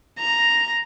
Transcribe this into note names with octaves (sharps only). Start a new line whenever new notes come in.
A#5